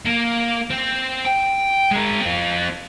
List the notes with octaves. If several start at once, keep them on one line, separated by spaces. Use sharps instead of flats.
A#3
C4
G5
G#3 A#4
C4 F4